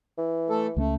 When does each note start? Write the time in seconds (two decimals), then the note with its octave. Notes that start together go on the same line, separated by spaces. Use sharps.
0.18 E3
0.50 A3 A4
0.76 C#2 F#3 A3 C#4